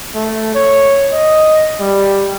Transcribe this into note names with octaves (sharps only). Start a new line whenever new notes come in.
A3
C#5
D#5
G3